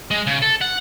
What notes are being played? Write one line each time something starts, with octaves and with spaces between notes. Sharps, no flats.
G#3
C#3
A4
F#5